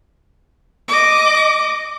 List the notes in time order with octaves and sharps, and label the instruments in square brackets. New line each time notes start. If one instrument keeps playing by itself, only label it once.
[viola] D#5 D6